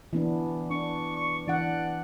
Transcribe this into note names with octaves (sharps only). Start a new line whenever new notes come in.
E3 B3 D4
D4 C#6
C#6
E3 D4 D5 F#5